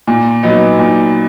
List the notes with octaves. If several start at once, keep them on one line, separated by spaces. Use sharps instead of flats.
A#2
F#3 B3 D#4
A#2